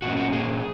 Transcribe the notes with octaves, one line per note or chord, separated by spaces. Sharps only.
A#2 A#3 C#4 F#4
F#4
A#2 A#3 C#4 G#4